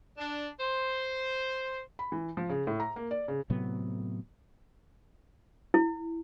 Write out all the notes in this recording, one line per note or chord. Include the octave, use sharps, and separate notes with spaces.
D4
C5
B5
E3
F3
C#3
A2
A#5
A#3
D5
C#3
A2 C3 F#3 B3
E4